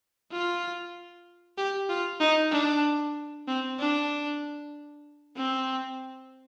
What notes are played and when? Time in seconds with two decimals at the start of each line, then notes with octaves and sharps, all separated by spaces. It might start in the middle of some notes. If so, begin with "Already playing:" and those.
0.32 F4
1.58 G4
1.89 F4
2.20 D#4
2.52 D4
3.47 C4
3.79 D4
5.37 C4